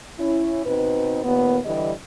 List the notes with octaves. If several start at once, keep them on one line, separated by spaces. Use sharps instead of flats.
C#4 E4
B2 C4 D#4 B4
D#2 A#2 B3
D3 E3 G3 G4 D#5